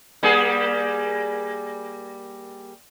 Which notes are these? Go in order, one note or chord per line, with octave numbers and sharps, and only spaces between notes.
G3 A#3 G#4